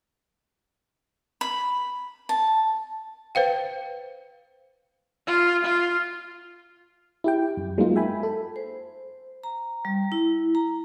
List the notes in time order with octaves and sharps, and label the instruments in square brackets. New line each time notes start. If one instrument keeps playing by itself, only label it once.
[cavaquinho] B5
A5
[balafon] B4 C5 F5 G5
[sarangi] F4
F4
[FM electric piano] E4 G4 G5
F#2
F#3 G#3 A#3 B3 D#4 F4
E5 G5 G#5 B5
A4 B5
[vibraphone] C5
A#5
G3
E4
A#5